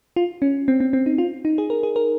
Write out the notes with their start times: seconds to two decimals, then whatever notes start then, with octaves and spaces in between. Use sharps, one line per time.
0.16 F4
0.42 C#4
0.68 C4
0.80 C4
0.93 C4
1.06 D#4
1.18 F4
1.45 D#4
1.58 G#4
1.70 A#4
1.83 G#4
1.96 A#4